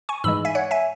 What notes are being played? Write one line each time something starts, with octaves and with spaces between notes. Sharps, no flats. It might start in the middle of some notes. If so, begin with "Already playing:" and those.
G#5 C#6
G#2 E3 G#3 B5 E6
E5 G#5
C#5 F#5
E5 G#5